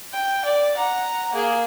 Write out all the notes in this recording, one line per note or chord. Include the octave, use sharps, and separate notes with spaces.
G5
D5
F#5 A#5
A#3 G#4